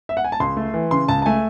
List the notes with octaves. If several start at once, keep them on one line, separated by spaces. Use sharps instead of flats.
E5
F#5
G#5
A5
C#2 C6
A3
E3
C#3 C6
C#2 A5
A5
A3 G#5